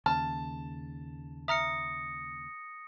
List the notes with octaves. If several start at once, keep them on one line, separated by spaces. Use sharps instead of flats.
D#2 C#3 A5 F6
E5 A#5 D#6 F6 A#6 C#7